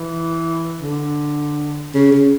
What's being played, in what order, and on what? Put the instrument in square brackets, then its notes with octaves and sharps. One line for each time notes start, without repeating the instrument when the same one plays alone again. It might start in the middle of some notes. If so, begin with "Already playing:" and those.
Already playing: [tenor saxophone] E3
D3
C#3
C#3